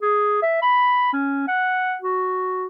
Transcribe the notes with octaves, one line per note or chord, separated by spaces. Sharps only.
G#4
E5
B5
C#4
F#5
F#4